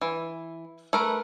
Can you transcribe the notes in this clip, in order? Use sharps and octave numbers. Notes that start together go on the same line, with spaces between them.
E3
A3 A#4 B4